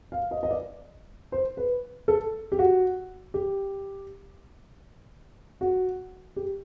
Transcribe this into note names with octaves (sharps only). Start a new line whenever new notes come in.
F5
D#5
D#5
D5
C5
B4
A4
G4
F#4
G4
F#4
G4